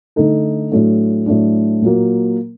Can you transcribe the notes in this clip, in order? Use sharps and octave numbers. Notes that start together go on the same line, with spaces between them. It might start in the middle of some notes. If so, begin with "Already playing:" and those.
D3 A3 D#4 A4
A2 F#3 A3 D4
A2 F#3 A3 D4
A#2 F#3 A#3